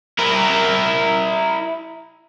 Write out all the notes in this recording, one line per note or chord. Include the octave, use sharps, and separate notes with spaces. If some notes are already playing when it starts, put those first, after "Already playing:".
E4 A#4